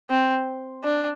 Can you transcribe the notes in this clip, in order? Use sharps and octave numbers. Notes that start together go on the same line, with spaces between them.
C4
D4